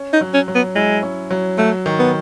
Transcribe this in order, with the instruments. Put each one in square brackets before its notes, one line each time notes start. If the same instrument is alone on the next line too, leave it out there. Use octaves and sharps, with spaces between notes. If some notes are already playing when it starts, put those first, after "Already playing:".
Already playing: [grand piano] C#4
[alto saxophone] D#4
[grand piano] F#3
[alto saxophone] C#4
[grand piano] F#3
[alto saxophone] B3
[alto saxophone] G#3 [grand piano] E4
[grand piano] C#4
F#3
[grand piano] F#3 [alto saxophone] A3
[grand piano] D#3
[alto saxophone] B3